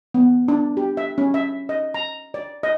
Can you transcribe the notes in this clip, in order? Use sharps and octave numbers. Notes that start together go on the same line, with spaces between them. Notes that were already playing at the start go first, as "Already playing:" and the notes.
B3
D4
G4
E5
C#4
E5
D#5
A#5
D5
D#5